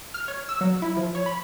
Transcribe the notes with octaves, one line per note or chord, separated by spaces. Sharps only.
F6
C#5
E6
F#3
E4
F3
C#5
B5